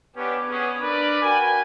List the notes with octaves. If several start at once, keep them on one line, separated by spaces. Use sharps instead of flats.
B3 C#4 D4 G4
B3 C#4 G#4
D4 A#4 B4 D5
F#4 A#4 B4 G5 G#5